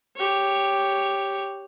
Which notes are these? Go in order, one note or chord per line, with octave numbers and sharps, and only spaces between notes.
G4 C#5